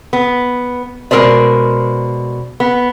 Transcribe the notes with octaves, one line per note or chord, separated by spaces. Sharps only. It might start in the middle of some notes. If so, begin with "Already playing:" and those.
B3
B2 G#3 A4 A#4 C5 D5
B3